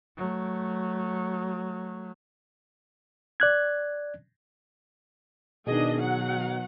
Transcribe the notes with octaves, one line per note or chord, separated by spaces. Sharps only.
F#3 A3
D5 F#6 G#6
B2 D#3 D4 G#4 D#5
F#3 F#5